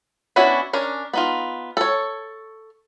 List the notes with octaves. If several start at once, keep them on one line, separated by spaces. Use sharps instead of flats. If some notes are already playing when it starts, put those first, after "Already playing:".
B3 C#4 D4 E4 F#4
C#4 D4 A#4
B3 D#4 F4
A4 C#5